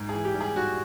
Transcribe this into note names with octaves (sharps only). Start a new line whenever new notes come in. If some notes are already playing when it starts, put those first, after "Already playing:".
Already playing: G#2
G#4
E3
G4
G3
G#4
G3 F#4